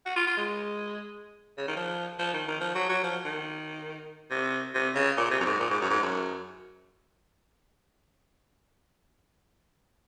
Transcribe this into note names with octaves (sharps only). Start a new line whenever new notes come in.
F#4
F4
F4
G#3
C#3
D#3
F3
F3
D#3
D#3
F3
F#3
F#3
F3
D#3
C3
C3
C#3
A#2
C3
F#2
G#2
A#2
G#2
F#2
G#2
F#2